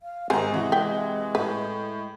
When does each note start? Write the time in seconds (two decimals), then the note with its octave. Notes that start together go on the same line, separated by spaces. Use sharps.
0.03 F5
0.30 G#1 G#3 C4 C5 G#5 A#5
0.52 C3 E3 F#4
0.72 E5 G5
1.35 A2 B4